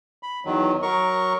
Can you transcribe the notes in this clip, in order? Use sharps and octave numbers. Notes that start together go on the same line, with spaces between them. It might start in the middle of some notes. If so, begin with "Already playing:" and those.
B5
E2 D#3 F#3
F#3 A#4 C#6